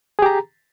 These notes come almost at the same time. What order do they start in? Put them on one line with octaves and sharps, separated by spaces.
G#4 G4 A#5